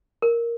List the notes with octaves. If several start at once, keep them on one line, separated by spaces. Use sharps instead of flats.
A#4